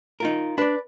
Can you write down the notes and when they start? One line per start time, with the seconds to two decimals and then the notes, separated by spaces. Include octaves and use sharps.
0.20 D#4 F4 A#4
0.58 D4 B4 D5